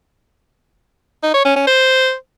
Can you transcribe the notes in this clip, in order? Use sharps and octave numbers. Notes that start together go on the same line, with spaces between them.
D#4
C#5
C#4
C#4
C5